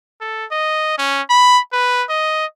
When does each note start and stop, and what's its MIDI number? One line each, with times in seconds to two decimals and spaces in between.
0.21 0.46 69
0.51 0.94 75
0.98 1.22 61
1.30 1.60 83
1.73 2.04 71
2.09 2.46 75